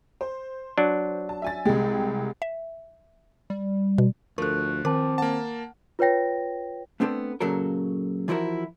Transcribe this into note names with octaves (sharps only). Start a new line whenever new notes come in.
C5
F#3 D4
A5
E5 G#5 A6
C2 G#3 G4
E5
G3
B2
D2 F3 A4 A#4 C#6 F#6
D#3 C4 A#4 A5 D6
A#3 F#5 A5
F4 B4 C#5 G5 A#6
A3 B3 C4 D4 A4
A#2 C#3 F#3 A4 A#4
E3 F3 E4 F#4 A#4